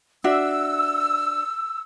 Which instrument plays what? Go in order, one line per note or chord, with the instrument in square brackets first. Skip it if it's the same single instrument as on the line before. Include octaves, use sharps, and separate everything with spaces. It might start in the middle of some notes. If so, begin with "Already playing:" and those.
[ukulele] D4 F#4 E5 [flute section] E6